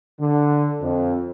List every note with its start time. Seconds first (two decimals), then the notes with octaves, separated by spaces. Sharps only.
0.20 D3
0.81 F2